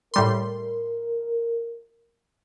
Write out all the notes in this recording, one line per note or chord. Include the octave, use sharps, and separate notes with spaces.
A2 G3 A#4 C6